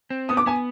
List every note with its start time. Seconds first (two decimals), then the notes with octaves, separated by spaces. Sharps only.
0.10 C4
0.29 B3 D#6
0.37 D6
0.46 B3 G#5